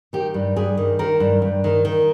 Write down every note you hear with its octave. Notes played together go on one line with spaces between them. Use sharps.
D#3 G4
G2
G2 G#4
D#3
D#3 A#4
G2
G2
D#3
D#3